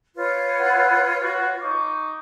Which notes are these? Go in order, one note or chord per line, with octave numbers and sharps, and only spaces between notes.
F4 B4 C#5
E4 F#5
F#4
D#4 C#6 D6